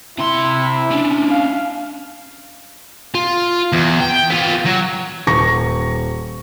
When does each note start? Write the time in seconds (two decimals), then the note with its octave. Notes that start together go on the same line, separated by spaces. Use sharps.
0.19 C3 E4 C6
0.91 C#4 D4
1.31 F5
3.15 F4
3.73 E2
4.00 G5
4.30 B3 F4
4.66 F#3
5.27 D#1 C#6 A#6